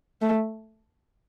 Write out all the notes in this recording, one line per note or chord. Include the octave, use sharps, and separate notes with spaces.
A3